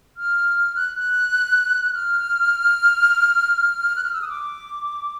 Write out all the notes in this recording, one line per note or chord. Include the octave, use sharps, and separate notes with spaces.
F6
F#6
F#6
F6
F#6
F6
E6
D#6
D6